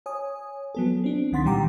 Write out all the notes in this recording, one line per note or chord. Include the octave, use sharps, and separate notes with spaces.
C#5 G#5 D#6
F#3 B3 A4
C4 D4
C#2 D#3 F#5 C6 A6 B6
A#2 E3 G3 G5 A#5 D6